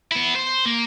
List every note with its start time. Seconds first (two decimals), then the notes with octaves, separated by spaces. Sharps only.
0.11 B3 E4
0.35 C5
0.65 A#3